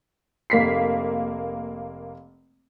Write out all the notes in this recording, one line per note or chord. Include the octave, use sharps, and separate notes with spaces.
F1 A#3 B6 C7